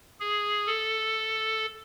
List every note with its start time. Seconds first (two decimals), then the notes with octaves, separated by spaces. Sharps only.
0.20 G#4
0.67 A4